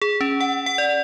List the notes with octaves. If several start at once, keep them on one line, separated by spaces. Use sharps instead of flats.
G#4
C#4
F#5
F#5
D5